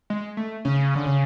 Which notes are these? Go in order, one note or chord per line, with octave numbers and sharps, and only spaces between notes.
G#3
A3
C#3 C#4
D3
C#3